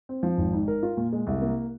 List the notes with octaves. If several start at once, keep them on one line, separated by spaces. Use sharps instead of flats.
C4
F3
G#1
G#2
A#4
F4
A#2
G#3
C2
A#3